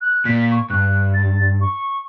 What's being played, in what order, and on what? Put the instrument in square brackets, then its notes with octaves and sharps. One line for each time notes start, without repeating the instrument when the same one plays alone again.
[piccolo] F#6
[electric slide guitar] A#2 [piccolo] B6
[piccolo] C#6
[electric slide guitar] G2 [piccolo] F#6
[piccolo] A6
C#6